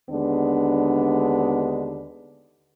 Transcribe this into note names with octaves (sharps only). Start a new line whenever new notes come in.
D#2 D3 G#3 B3 D4